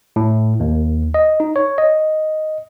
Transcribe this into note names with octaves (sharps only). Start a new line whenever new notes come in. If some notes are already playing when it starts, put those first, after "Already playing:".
A2
D#2
D#5
D#4
C#5
D#5